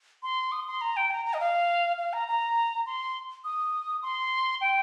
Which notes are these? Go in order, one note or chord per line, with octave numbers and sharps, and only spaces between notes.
C6
D#6
C6
A#5
G5
A#5
A#5
D#5
F5
F5
A#5
A#5
C6
D#6
C6
G5